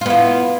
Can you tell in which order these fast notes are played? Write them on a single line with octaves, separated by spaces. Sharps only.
F4 B3 E4